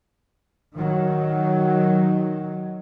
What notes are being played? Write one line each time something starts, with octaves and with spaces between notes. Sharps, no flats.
D#3 F#3